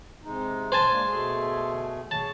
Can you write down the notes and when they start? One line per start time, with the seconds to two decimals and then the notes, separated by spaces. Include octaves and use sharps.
0.24 C3 G#3 D#4
0.72 F2 C5 G#5 A5
0.88 G#3 A#3 D4
1.07 B2 A3 G#4
2.11 G#4 C#5 A5